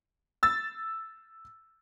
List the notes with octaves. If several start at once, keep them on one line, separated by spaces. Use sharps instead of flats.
E6 A6